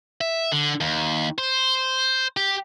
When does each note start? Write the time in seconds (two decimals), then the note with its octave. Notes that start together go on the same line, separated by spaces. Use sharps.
0.21 E5
0.52 D3
0.81 D#2
1.38 C5
2.37 G4